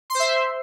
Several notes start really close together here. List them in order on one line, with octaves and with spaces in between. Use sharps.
C6 C5 E5